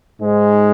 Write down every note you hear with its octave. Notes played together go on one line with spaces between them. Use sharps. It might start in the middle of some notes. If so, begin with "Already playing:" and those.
G#2 G#3